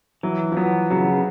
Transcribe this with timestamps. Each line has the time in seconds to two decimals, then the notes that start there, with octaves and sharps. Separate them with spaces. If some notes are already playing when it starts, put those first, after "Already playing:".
0.23 E3 F#3
0.52 F3
0.57 F#3 B3
0.90 C#3 F#3